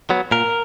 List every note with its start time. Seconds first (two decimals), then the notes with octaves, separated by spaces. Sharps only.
0.10 F#3 B3
0.31 A#2 A#4